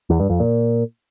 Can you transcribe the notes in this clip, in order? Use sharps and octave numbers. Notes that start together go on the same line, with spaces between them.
E2
G2
F2
A#2